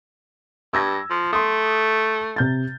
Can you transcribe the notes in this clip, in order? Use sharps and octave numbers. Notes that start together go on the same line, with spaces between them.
G2 E6 G#6 A#6
F3
A3 C6 D#6
C3 G6 A6